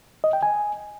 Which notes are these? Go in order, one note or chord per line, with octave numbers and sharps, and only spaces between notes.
D#5
G5
G#5